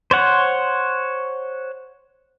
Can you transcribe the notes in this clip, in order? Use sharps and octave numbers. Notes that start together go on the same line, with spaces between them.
C5 C#5 F#5